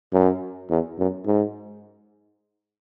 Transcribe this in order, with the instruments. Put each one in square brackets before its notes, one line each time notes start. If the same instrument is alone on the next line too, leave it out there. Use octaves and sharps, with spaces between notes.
[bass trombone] F#2
E2
F#2
G#2